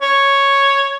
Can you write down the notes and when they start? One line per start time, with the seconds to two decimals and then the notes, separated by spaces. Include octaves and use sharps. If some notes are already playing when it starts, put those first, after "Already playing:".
0.02 C#5